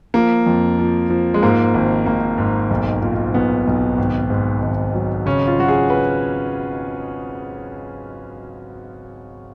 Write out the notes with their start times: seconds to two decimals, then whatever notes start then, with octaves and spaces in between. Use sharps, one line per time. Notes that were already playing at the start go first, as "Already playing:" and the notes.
0.14 F3 A#3
0.46 F2
0.79 F3
1.10 F3
1.34 G#3
1.42 G#2 A#3
1.74 G#1
2.06 G#1 A#3
2.38 G#2
2.70 B1
3.02 A#2
3.34 B1 B3
3.67 B1
3.98 G#1
4.30 G#2
4.62 G#1
4.94 F#3
5.26 C#3 C#4
5.47 F4
5.58 F#3 F#4
5.68 G#4
5.90 B4